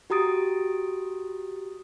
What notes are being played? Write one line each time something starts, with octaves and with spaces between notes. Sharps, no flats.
F#4 G4 A#5 D#6 A6 D7